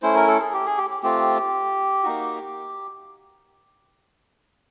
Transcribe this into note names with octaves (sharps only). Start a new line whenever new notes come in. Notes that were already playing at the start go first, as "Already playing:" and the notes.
A3 C#4 E4 C5
A#4
A4
G#4
G4
G#4
G4
G4
A3 C4 F4 G4
A#3 D#4 F#4